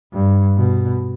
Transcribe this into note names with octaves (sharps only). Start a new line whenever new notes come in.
G2
B2